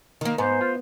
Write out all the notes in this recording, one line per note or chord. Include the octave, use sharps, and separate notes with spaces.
D#3 A#3
G#2 B3 C5
F4